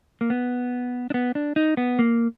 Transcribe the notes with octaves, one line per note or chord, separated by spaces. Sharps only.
A#3
B3
D4
B3
D4
D#4
B3
A#3